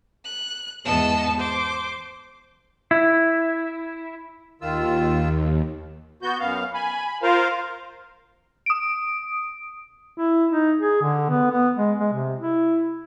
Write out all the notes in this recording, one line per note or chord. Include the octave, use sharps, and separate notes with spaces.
F#6
E2 G#2 B3 D#5 A5 E6
C5 D6
E4
D#2 D#3 F4 E6
B3 F#4 G6
F#2 B3 F5
G#5 B5
B5
F4 A#4 C5 F5
D#6 D7
E4
D#4
G#4
D3
B3
B3
G#3
G#3
C3
E4